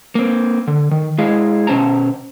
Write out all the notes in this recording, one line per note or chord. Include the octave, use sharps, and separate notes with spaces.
A#3 C4
D3
D#3
G#3 E4 G#4 D#5 F5
B2 C#4 C5 A5 A#5